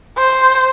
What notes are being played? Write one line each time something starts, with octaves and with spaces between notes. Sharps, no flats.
C5